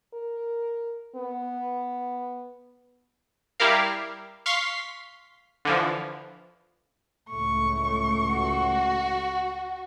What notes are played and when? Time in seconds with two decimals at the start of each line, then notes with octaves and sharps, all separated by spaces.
0.14 A#4
1.16 B3
3.60 G3 E4 G4 A#4 F5
4.46 F5 C6 C#6 B6 C7
5.65 D3 E3 F3
7.30 C#2 A2 A3 C#6
8.32 F#4